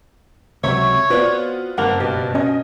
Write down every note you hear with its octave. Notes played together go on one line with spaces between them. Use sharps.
C#2 C3 F#3 C#5 E5 C#6
B3 C4 F4 F#4 B4 D5
F#1 G2 A#3 F#5
B2 G4
C#4 D#5